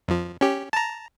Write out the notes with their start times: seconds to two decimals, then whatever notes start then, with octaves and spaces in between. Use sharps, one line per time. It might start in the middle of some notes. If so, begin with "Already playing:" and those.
0.08 F2 F3
0.41 C#4 G4
0.73 A5 A#5